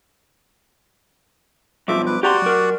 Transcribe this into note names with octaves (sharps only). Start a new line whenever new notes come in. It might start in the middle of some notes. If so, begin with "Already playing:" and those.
B1 G2 F3 E5 D6
B4 D6
F#4 G4 D5 F#5 A#5 C6
F#3 A#4